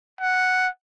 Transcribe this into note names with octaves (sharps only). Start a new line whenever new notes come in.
F#5